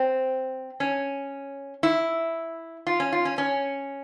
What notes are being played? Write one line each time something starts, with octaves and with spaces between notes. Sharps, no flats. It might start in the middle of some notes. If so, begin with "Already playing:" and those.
Already playing: C4
C#4
E4
F4
C#4
F4
C#4
C#4